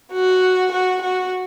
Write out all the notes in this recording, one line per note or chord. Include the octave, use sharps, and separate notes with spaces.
F#4
F#4
F#4